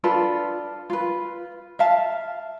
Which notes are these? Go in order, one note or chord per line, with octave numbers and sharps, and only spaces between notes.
D4 F4 A4 B4
F4 B4
E5 F5 A5